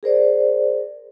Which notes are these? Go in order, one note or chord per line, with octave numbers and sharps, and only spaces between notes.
G#4 A#4 C5 D5